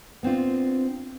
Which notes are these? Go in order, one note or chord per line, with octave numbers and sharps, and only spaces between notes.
B3 C4 D4 F4